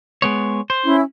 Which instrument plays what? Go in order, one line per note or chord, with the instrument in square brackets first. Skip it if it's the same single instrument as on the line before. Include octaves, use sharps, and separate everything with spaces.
[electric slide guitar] G#3 B3 C#5
C5
[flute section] C#4 E4